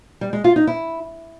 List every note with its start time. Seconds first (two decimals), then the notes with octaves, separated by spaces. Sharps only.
0.21 G3
0.33 G#3
0.44 F4
0.56 D#4
0.67 E4